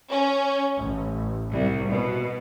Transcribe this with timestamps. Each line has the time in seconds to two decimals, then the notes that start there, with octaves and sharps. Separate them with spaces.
0.10 C#4
0.80 A1
1.51 C2
1.90 B2